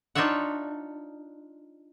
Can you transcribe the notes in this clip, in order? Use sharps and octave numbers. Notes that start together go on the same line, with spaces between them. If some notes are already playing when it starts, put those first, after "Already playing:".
D4 D#4 F4 C#5 E5 F#5